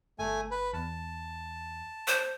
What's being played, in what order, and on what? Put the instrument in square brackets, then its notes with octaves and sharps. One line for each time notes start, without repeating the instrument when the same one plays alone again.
[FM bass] G1 [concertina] A3 G#5
[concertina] B4
[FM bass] E2 [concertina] A5
[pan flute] C5